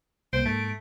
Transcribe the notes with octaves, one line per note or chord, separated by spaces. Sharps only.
C2 A#3 C5 D7
G#2 A3